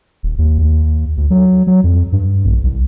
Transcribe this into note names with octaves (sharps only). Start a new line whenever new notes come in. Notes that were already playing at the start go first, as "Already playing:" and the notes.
D#1
D#2
D#2
D2
F#3
F#3
F2
G2
A#1
C2